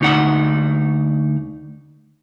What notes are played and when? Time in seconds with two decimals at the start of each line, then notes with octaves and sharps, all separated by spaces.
0.01 D2 D#4 F#5